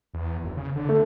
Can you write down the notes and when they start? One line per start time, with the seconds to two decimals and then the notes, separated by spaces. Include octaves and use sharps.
0.14 E2
0.43 F#1
0.57 C#3
0.75 D3
0.89 A3